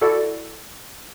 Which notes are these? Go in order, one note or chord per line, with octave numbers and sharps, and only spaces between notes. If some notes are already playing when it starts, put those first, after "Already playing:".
E4 F#4 A4 D5